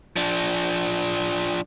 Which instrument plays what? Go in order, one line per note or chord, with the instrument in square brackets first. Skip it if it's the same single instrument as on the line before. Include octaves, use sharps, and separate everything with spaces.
[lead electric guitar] F3 D4